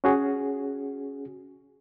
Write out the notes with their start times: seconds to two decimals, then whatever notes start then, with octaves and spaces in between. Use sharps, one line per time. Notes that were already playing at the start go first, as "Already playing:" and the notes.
0.04 C#4 F#4 G#4